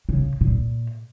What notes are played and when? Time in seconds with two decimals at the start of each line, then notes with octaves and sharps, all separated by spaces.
0.09 C#3
0.41 A#2